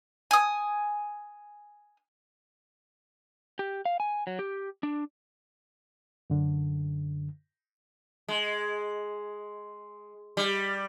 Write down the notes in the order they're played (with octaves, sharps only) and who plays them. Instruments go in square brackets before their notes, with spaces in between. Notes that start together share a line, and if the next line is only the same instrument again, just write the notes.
[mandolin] G#5 D#6
[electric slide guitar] G4
F5
G#5
F#3
G4
D4
[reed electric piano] F#2 D3
[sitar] G#3
G3